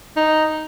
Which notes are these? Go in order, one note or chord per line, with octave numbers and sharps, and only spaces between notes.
D#4